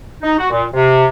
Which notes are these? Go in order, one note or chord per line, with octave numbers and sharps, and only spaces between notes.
D#4
F#4
A#2
C3